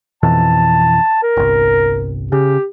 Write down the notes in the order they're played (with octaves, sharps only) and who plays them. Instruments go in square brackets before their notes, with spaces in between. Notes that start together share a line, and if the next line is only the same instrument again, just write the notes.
[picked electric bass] F2 B2 E3 [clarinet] A5
[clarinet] A#4
[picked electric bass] G1 C2
[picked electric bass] C#3 [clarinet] G4